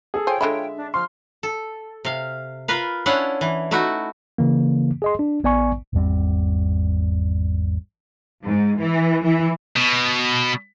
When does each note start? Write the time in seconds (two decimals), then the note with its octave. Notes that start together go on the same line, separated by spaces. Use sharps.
0.14 G#4 A4
0.27 F4 C5 C#5 G5 G#5
0.41 D3 G#3 E5 B5
0.77 D4
0.94 F3 C6 F6
1.43 A4
2.05 C3 F5
2.68 F4 A#4 B4 F5
3.06 C#4 D4 E4 F4 F5 F#5
3.41 E3
3.71 A3 D#4 E4 F#4
4.38 C#3 E3 A#3
5.02 G#4 D#5 C6
5.19 D4
5.44 A1 B3 D5 G#5 C#6
5.93 G#1 E2 G3 C4
8.45 G#2
8.78 E3
9.23 E3
9.76 B2